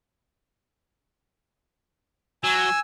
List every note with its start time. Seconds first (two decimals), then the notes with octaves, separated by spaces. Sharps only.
2.44 F#3 G#5 E6